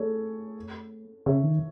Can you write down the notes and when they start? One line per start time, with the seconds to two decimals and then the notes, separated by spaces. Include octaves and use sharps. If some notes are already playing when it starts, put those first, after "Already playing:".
Already playing: A3 G#4 A4 C#5
1.26 C#3 C#5 E5
1.44 D#3